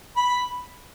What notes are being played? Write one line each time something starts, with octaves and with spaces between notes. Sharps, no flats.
B5